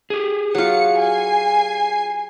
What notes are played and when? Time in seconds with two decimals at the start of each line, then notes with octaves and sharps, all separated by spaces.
0.10 G4 G#4
0.55 F#3 F4 C#7
0.99 G#5 C7